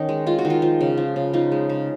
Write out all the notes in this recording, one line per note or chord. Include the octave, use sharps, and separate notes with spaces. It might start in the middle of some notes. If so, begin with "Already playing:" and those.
Already playing: D#3 C#4 D#4
G#3
G#3 F4
F#4
D#3
F4
F3
C#3
F3
C#3
F3 D#4
G#3
C#3